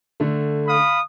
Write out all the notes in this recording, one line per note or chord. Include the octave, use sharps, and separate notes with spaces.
D3 A3
F5 B5 D#6